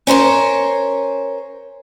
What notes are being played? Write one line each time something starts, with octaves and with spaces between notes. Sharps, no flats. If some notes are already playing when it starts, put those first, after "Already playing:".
C#4 A#4 C5 C#5